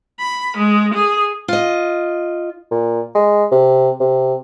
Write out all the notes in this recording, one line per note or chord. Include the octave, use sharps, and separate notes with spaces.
B5
G#3
G#4
F4 D#5
A#2
G#3
C3
C3